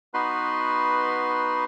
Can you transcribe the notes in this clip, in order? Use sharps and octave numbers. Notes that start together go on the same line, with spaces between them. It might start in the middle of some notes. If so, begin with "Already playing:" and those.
B3 D#4 F#4 B4 C6